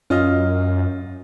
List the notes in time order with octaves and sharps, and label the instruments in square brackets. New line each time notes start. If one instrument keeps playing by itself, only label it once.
[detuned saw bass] F#2 [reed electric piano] C#4 F6 [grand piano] F4 D#5